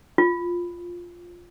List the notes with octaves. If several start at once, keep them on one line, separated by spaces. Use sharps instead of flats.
F4